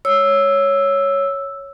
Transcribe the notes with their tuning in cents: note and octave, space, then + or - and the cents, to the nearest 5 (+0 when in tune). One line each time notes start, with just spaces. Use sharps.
C#5 +0 E6 +0